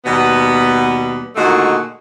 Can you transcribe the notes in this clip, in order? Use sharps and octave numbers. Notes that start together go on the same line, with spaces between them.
D#2 B2 G3 B3
A#2 D3 D#3 G#3 A3 F#4